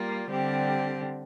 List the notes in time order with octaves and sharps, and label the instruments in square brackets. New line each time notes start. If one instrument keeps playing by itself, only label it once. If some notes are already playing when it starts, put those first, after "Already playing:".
Already playing: [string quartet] G3 A#3 F4
D3 G3 C4 G4